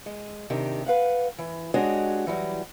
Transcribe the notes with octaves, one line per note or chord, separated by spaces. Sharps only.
G#3
C3 D#3 D4 G4
B4 F5 F#5
E3
G#3 D4 F#4 G4 C#5 D#5
E3 F#3 G3